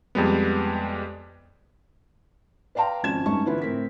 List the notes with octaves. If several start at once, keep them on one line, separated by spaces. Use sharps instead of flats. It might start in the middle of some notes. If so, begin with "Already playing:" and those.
F2 G3 G#3 B3
B4 D5 F5 G5 A#5 C6
G#1 F3 C#4 A5 G#6 E7
G2 A3 C#4 D#4 A5 C#6
D3 E3 B3 E4 F4 B4
A2 C4 A#4 B6